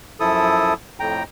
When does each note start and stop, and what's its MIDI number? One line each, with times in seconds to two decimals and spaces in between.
0.20 0.74 42
0.20 0.74 53
0.20 0.74 64
0.20 0.74 69
0.20 0.74 87
1.00 1.23 41
1.00 1.23 45
1.00 1.23 79
1.00 1.23 82